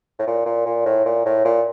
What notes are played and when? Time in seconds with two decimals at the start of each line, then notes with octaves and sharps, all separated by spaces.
0.19 A2
0.27 A#2
0.46 A#2
0.66 A#2
0.86 A2
1.05 A#2
1.25 A2
1.45 A#2